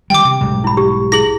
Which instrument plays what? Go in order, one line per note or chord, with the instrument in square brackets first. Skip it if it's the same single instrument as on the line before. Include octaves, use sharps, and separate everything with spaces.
[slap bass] D#3 E3 G3 [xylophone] G5 D6
[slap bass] C3
B1 G#2 G3
[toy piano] E4 B5
G4
[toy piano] E4 G#4 [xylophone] A#6 F#7